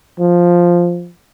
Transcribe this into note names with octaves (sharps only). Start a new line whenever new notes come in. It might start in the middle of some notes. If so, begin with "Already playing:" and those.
F3